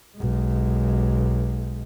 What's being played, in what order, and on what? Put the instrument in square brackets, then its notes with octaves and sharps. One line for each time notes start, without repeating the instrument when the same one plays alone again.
[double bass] B1 G#3